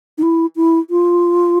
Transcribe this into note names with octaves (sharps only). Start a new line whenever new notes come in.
D#4
E4
E4
F4